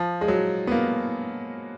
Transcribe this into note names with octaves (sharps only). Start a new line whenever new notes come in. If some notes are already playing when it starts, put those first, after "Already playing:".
Already playing: F3
G#3
F#3
B3
A#3